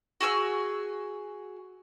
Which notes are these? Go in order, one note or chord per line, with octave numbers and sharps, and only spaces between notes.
F#4 G#4 G#5 E6